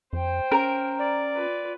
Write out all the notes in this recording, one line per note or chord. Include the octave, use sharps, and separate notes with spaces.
F2 C5 G5
C#4 A#4
D5
F4 B4